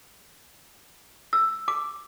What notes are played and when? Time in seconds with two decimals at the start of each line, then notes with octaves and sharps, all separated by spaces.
1.33 E6
1.68 D6